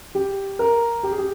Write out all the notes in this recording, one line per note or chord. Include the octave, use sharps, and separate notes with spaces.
G4
A#4
G4
G#4
G4